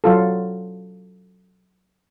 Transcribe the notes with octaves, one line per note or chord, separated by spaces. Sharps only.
F#3 F4 A4